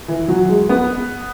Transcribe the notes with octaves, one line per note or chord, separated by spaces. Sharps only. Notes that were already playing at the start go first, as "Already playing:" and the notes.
E3
F#3
G#3
B3